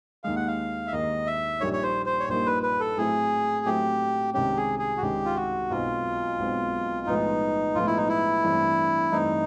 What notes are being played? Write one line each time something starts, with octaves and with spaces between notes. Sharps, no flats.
D#2 D#3 G#3 F5
F#5
F5
E5
D#2 D#3 G#3 D#5
E5
A#1 A#2 G3 A#3 D#4 C#5
C#5
C5
C5
C#5
A#1 A#2 G3 A#3 D#4 C5
B4
B4
A4
A2 F#3 A3 C4 E4 G#4
A2 F#3 A3 C4 E4 G4
C2 C3 D#3 G#3 C#4 G4
G#4
G#4
F#4
C2 C3 D#3 G#3 C#4 G4
F4
F#4
B1 B2 G#3 C4 F4
B1 B2 G#3 C4
B1 A2 F3 G#3 B3 D#4
B1 A2 F3 G#3 B3 F4
E4
D#4
E4
G2 E3 A3 C4
G2 E3 A3 C4 D#4